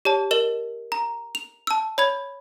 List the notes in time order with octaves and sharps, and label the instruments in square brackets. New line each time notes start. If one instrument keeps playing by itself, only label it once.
[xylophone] G4 C#5 A5
A#4 D#5 E7 G7
A#5
F7
A5 E6
C#5 B5 G#6